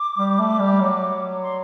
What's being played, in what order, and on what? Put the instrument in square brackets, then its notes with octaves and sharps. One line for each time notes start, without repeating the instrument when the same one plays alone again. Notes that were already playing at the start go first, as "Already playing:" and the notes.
Already playing: [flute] D6
[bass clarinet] G3
A3
G3
F#3
[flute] C6